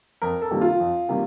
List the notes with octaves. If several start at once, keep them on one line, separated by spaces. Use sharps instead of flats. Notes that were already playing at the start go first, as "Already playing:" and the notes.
F2 A#4
A4
C3 D#3 G3 A#3
F4
F2
C3 D#3 G3 A#3